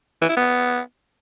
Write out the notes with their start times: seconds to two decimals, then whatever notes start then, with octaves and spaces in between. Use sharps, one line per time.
0.22 E3
0.29 E4
0.37 B3